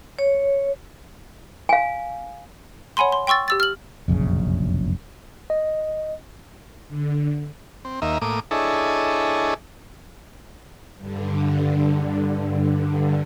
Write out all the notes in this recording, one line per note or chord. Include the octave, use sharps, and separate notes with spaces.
C#5
F5 G#5
C#5 F#5 G#5 B5 C6
C6
G5 C6 C#6 E6 A6
G4 E6 A6
F6 F#7
F1 A#1 F#2 C#3
D#5
D3
C4
D#2 A#3 D#5 E5
A2 A#3 D6 D#6
D4 E4 G#4 A4 C#5 D#5
G2 D3